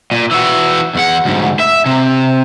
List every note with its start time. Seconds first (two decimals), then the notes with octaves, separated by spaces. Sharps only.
0.12 A#2
0.31 E3 F#4
0.95 E2 F#5
1.25 D2 G#2
1.60 E5
1.86 C3